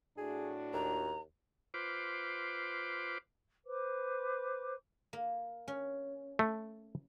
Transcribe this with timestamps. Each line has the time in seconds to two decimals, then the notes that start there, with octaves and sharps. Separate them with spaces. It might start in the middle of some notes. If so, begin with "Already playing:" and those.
0.18 A2 D4 F#4 G#4
0.73 D#2 A#5
1.74 F4 B4 C5 D6
3.66 B4 C5 D6
5.13 A#3
5.68 C#4
6.39 A3